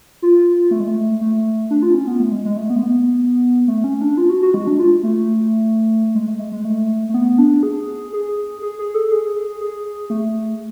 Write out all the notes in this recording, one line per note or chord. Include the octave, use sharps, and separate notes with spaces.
F4
A3
G#3
A3
A3
D4
F4
C#4
B3
A3
G#3
G#3
A3
B3
A3
B3
A3
C#4
D4
F4
F#4
F#4
G#3
D4
F4
A3
G#3
A3
G#3
G#3
A3
A3
B3
D4
G#4
G#4
G#4
G#4
A4
G#4
G#4
A3